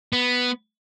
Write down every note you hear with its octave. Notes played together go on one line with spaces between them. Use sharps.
B3